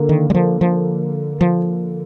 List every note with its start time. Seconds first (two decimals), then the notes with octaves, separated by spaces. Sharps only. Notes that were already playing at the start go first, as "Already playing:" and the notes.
Already playing: D3 A#3
0.09 D#3
0.30 G3
0.35 F3
0.61 F3
1.41 F3